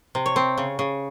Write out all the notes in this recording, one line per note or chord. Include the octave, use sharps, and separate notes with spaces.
C3
C#5
C4
C#3
C#3